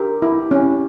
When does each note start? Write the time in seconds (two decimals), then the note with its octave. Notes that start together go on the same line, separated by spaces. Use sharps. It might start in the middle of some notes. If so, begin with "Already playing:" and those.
Already playing: D4 G4 A#4
0.22 E4
0.51 C#4